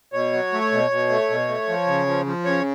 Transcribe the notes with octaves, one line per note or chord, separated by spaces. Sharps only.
B2 C#5
F#3
A3
B2
B2
A3
B2
A3
F3
C#3
F3
F3
C#3 C#5